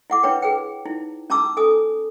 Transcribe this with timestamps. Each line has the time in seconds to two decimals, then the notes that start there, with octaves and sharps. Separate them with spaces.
0.10 E4 F#5 D6
0.23 D4 E4 B4 C#5 G5
0.42 G#4 B4 G5
0.85 D#4 E4
1.30 C#4 A5 A#5 D6 E6
1.57 A4 G#5 D#6